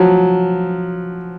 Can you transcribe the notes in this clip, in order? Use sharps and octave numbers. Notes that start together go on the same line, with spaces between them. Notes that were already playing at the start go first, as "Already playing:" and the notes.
Already playing: F3 F#3